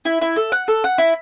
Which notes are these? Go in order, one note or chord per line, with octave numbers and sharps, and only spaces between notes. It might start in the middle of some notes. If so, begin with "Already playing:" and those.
E4
E4
A4
F#5
A4
F#5
E4